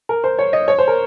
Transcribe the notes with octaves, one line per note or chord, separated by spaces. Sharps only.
A#4
C5
C#5
D#5
C#5
C5
A#4